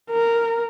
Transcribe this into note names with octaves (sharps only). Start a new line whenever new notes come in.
A#4